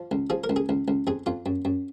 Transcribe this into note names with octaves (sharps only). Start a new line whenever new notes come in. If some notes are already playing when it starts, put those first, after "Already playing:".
Already playing: F3
C#2
F3 G#4
A#4
C#2
G#4
C#2
C#2
F2 G#4
F2 F4
F#2
F#2